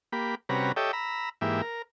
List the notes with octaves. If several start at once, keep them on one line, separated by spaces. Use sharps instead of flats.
A#3 G4 B5
C3 G3 C#4 F#4 B4 A#5
G4 A4 C#5 D#5 E5 G5
A#5 B5 E6
G#2 E3 A#3 G4 E5
A#4